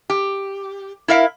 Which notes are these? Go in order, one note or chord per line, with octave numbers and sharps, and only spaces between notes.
G4
E4 A#4 E5 F5